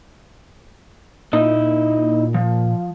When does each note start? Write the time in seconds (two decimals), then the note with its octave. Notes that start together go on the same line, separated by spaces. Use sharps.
1.33 A#2 D#4 E4 D#5
2.34 F3